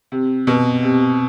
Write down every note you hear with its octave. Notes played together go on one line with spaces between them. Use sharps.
C3
B2
C3